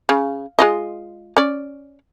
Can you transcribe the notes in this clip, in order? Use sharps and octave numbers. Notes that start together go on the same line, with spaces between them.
C#3
G#3 F4 D#5
C#4 D5